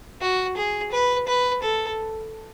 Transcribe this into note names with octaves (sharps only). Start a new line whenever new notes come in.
F#4
G#4
B4
B4
A4